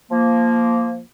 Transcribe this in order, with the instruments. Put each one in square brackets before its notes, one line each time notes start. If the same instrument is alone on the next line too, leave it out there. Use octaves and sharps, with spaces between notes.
[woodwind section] F3 A#3